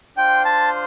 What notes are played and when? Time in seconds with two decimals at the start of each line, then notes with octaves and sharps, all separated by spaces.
0.17 D4 F4 C5 G5
0.45 A5